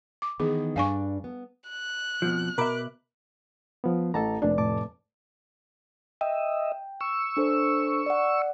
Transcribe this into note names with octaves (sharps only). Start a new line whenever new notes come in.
D6
D#3 E3 B3 G#4
G2 D4 D5 F5 G#5 C#6
B3
F#6
F2 B2 F3
B2 A#4 E5 B5 D6
F3 B3
A1 A4 A5 A#5
F1 D4 D5
A2 A5 D6
D#5 E5 G5
C#6 E6
D4 A4 C5
D5 F#5